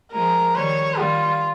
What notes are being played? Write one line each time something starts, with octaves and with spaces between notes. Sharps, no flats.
F3 G#3 A#4
D#3 G3 C#5
D#3 G3 F4